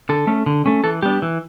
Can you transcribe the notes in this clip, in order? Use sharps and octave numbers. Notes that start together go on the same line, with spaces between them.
D3 A4
A3 C#4
D3
A3 C#4
E3 A4
G3 B3 D4 G4
E3